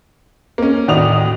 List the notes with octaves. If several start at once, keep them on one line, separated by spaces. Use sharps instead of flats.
A#3 C#4
D#2 A2 F#4 D5 D#6 F7